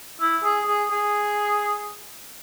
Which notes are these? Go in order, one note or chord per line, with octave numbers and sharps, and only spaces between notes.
E4
G#4
G#4
G#4